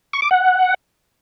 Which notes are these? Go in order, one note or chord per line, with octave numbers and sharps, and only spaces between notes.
C#6
D6
F#5